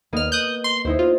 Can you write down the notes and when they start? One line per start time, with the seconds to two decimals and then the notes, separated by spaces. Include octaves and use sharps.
0.13 D#2 A#3 B3 D#5 F6
0.32 D#6 F#6 G6
0.64 C6
0.85 D#2 D#4 E4 C5
0.99 F4